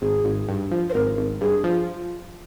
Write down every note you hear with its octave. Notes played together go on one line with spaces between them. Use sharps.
G#1 G#4
G#1
G2
F3
C5
G#1 A#4
G#1
G2 G#4
F3